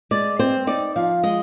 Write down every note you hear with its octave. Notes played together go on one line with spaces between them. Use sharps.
G#3 D5
C4 C5
D#4 D5
F3 F5
G#3 D#5